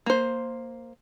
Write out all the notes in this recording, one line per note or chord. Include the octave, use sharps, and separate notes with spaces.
A#3 C5